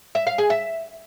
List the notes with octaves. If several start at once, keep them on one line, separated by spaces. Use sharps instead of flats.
E5
F5
G#4
E5